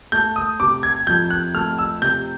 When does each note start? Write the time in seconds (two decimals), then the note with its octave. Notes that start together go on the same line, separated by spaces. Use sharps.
0.12 A3 G6
0.36 D#6
0.60 C3 D6
0.83 G#6
1.07 F2 G6
1.30 F#6
1.54 A3 F6
1.79 E6
2.02 C3 G6